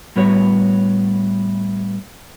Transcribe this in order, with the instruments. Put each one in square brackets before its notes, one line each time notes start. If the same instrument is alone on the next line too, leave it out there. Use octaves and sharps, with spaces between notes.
[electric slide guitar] A2 G3 B3 F#4 C#5